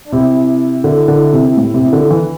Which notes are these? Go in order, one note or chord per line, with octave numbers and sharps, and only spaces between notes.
D4
C3 E4
D3
D3
C3
A2
C3
D3
E3